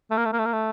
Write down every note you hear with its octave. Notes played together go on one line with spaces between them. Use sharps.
A3
A#3
A3
A#3
A3
A#3
A3